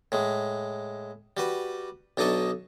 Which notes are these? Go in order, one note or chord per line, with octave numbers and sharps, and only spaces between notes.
A2 G#3
G3 F#4 B4
B1 D4 D#4 A4 D#5 C#6